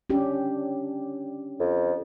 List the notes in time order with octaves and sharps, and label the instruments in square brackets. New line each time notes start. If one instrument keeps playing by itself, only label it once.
[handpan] C#4 D4 G4
[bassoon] F2